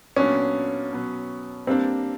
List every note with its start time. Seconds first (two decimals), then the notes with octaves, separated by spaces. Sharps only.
0.16 A#2 F#3 B3 C#4 D4
0.92 B2 F#3 B3
1.67 G3 A#3 C4 D4